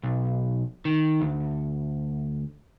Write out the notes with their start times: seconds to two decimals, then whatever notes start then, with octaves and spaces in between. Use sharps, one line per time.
0.03 B1
0.85 D#3
1.21 D2